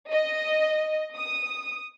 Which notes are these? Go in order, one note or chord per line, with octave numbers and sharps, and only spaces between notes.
D#5
D#6